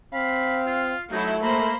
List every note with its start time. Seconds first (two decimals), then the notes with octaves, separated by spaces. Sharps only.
0.14 C4 F5 B5
0.67 F4
1.12 F#3 A3 D#4 E4
1.43 A#3 C5 A#5 B5